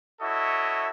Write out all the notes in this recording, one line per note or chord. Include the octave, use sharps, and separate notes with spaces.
E4 F#4 A4 C#5 D#5 E5